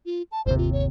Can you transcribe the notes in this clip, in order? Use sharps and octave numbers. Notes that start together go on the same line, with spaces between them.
F4
A5
G1 D#2 C3 C5
F4
C#5